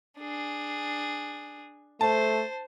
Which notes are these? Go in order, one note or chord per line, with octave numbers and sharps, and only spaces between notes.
D4 G#4
A3 C5 A5